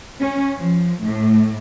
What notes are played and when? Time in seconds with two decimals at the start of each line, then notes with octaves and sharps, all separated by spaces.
0.20 C#4
0.57 F3
1.04 A2